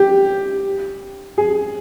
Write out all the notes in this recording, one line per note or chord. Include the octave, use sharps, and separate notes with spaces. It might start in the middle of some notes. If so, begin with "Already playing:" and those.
Already playing: G4
G#4